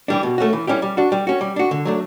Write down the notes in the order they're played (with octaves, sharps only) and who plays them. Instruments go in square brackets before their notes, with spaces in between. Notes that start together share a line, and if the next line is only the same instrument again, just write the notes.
[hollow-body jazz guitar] E3 G3 D4
B2
A3 C#4 F#4
E3
G3 C#4 E4 G4
G3
D4 F#4
G3
C#4 F#4
G3
D4 F#4
D3
F#3 A3 D4